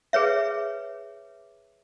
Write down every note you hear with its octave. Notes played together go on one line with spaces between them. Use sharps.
G#4 B4 C#5 E5